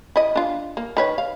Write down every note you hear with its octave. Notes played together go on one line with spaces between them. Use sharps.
E4 D#5
D4 F4
A#3
D#3 B4 C#5
F5